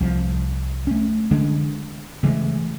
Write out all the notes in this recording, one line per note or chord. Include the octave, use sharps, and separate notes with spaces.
C2 F3
A3 C#4
D3 G#3 D4
C#3 E3 G#3 A3